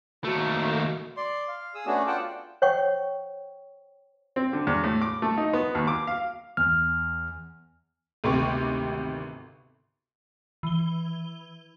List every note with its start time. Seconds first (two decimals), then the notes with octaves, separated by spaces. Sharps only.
0.24 D#2 A3 F#4
1.17 D5 C6
1.48 F5
1.75 G#4 D#6 E6
1.86 A3 B3 C#4 D4 F#4 G#4
2.07 F4 D5 F#5 G5 A5
2.62 C5 C#5 F#5 G5 C#6
4.36 C4
4.53 D3
4.67 E2
4.84 A2
5.01 D6
5.22 A3
5.37 D#4
5.53 B3
5.75 D#2
5.87 D6
6.07 F5
6.57 E2 F6
8.24 G#1 D2 C3 B3 G4 C#6
10.63 E3 G7